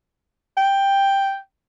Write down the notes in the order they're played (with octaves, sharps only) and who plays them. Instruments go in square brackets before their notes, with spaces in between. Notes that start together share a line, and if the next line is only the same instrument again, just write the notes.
[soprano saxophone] G5